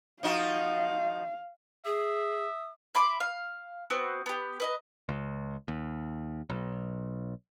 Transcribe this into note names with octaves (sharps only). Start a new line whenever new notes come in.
F3 D#4 F#4 F5
G#4 E5 D#6
E5 B5 C6 D6
F5
B3 C4 F#4
B3 G4
B4 D#5 A#5
C#2
D#2
B1